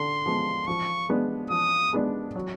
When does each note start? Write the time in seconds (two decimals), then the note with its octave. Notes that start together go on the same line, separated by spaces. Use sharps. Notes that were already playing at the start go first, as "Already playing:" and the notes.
Already playing: D3 C6
0.26 F3 G#3 B3
0.68 F3 C#6
1.09 G#3 B3 D4
1.51 F3 D#6
1.93 G#3 B3 D4
2.35 F#3